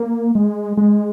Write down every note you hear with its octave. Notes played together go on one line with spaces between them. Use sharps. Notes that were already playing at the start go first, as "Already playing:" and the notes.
Already playing: A#3
G#3
G#3